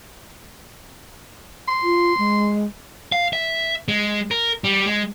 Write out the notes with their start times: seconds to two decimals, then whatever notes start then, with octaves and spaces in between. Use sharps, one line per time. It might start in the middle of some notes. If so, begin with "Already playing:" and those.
1.68 C6
1.83 F4
2.18 G#3
3.12 F5
3.33 E5
3.88 G#3
4.31 A#4
4.64 G3
4.86 G#3